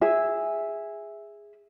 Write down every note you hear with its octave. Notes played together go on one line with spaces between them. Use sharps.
G#4 E5